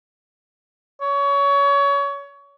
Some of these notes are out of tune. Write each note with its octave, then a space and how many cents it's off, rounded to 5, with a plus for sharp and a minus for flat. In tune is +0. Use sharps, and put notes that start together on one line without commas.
C#5 +25